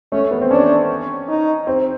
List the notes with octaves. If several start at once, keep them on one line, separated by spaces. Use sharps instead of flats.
A3 C#4
B3
C4
C#4 D4
D#4
C4